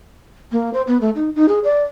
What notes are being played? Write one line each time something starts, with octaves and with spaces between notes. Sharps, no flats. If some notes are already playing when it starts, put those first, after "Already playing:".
A#3
C5
B3
A3
D#4
D#4
G#4
D5